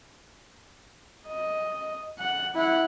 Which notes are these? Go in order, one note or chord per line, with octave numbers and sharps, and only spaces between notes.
D#5
F#5
E4 F#5